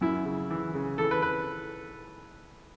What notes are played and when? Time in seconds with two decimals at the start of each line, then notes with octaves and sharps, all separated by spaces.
0.01 F#2 E4
0.25 C#3
0.51 E3
0.74 C#3
0.98 E3 A4
1.11 B4
1.22 B4